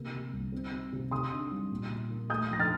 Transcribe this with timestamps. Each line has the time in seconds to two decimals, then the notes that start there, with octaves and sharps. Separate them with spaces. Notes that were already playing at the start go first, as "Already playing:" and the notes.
Already playing: C3 A#3
0.13 C3
0.33 C2
0.52 C4
0.71 C4
0.92 C3
1.11 C3 C6 D#6
1.31 D4
1.51 G3
1.71 A#2
1.90 A#2
2.10 A#3
2.30 A3 D#6 G6
2.50 F2 A#6
2.60 F6 A6